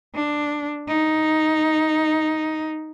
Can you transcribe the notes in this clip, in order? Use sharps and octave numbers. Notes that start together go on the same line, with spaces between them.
D4
D#4